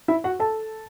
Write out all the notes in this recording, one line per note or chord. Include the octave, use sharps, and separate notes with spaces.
E4 E5
F#4 F#5
A4 A5